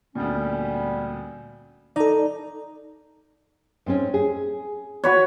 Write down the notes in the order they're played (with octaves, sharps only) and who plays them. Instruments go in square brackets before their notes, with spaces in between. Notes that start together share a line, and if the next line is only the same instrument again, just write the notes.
[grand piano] D2 A#2 [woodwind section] G3 B3 C#4
[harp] D#4 [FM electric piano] A4 D5
[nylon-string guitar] G#2 C4 C#4
G#4
[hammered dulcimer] F#4 B4 C#5